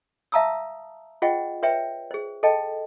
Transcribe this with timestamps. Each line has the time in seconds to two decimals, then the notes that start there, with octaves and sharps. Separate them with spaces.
0.32 E5 F5 A5 A#5 D#6 E6
1.22 F4 G#4 C5 D#5 F#5 G5
1.63 B4 C#5 E5 G5
2.11 G#4 C5
2.43 A4 D#5 G5 A5